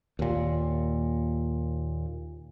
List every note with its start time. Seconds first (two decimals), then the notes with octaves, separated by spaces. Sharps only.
0.19 D#2 A#2